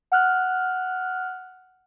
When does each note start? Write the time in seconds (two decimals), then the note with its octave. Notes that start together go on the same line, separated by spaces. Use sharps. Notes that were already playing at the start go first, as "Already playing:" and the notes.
0.12 F#5 F6 F#6